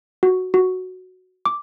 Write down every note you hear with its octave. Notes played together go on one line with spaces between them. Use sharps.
F#4
F#4
D6